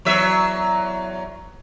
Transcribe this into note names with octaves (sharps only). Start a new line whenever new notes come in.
E2 F#3 E5